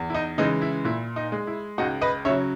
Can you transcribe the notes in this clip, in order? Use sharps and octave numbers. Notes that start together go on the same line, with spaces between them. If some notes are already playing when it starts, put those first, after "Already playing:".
Already playing: E2
E4
D#4
C#3 E3 G#3 D#4
E4
A#2 E4
D#4
G#3
E4
C#2 D#4 F#4
B4 D#5
C#3 F#3 C#5 E5